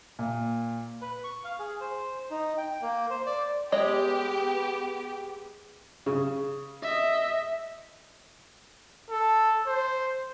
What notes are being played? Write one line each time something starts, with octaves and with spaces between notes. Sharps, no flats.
A#2
B4
C#6
F5
G#4
C5
D#4
G5
A#3
C5
D5
G#3 B3 G4 C#5 D#5
C#3
D#5 E5
A4
C5